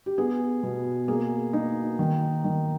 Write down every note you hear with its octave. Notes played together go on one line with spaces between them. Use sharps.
G4
B3 G#4
B2
A#3 G#4
A#3 D#4
D#3
D#3